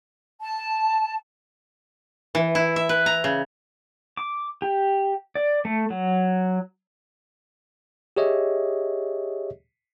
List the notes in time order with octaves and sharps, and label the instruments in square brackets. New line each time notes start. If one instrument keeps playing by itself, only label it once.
[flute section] A5
[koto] E3
E4
E5
B4
A#5
C#3
[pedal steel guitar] D6
G4
D5
A3
F#3
[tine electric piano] G4 G#4 C#5 D#5 E5